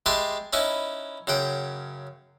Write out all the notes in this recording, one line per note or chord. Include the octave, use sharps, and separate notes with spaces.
G#3 G4 B4 E5 A5 C6
C#4 D#4 E4 B4
F#2 C#3 F#5 G5